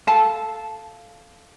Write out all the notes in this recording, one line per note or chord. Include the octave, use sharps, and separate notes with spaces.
A4 F5 A5